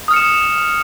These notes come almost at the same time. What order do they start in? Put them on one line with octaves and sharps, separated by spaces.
D#6 F6 C#7 E7